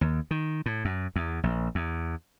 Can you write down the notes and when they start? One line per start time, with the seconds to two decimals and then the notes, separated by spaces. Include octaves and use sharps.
0.01 D#2
0.31 D#3
0.66 A2
0.85 F#2
1.16 E2
1.43 A#1
1.75 E2